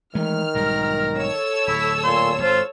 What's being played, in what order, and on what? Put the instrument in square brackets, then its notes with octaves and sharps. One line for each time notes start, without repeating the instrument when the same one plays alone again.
[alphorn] D#3 [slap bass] E3 G#3 A3 [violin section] F6
[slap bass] B1 G#2 G3 [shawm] A#4
[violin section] A4 C#5 E6
[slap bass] D1 [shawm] E4
[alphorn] A#2 [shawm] C6
[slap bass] G#1 [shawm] F4 [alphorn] C5